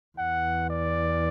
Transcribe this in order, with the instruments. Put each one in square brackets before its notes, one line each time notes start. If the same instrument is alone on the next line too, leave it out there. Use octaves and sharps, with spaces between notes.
[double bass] E2 [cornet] F#5
[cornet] D5